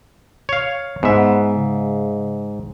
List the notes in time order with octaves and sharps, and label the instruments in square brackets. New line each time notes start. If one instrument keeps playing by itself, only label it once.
[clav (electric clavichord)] C#5 F5
[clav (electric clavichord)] G#2 E5 [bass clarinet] B3
[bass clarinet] C#3